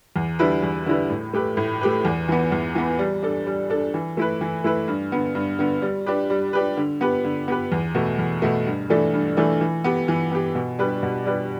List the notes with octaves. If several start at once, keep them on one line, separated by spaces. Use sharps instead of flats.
E2
D3 G3 E4 B4
E2
D3 G3 E4 B4
A2
A3 G4 B4
A2
A3 G4 B4
E2
E3 B3
E2
E3 B3
G3
D4 A4
G3
D4 A4
E3
A3 E4 B4
E3
A3 E4 B4
G2
D3 B3
G2
D3 B3
G3
D4 G4 B4
G3
D4 G4 B4
D3
B3 G4 B4
D3
B3 G4 B4
E2
B2 A3
E2
B2 A3
G2
E3 A3 D4 A4
G2
E3 A3 D4 A4
E3
B3 G4
E3
B3 G4
B2
G3 D4 G4 B4
B2
G3 D4 G4 B4